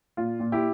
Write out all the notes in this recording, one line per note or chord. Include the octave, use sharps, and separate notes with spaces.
A#2 F4
A#2
E4 G4